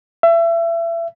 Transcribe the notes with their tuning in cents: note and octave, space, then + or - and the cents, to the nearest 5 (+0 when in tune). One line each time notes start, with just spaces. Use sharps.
E5 +30